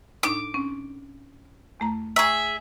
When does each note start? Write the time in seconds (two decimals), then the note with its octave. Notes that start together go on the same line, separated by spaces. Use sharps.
0.23 A2 D4 D#4 D6
0.54 C4 C#4
1.80 E2 A3 A#5
2.16 G#4 E5 G5 A#5 C#6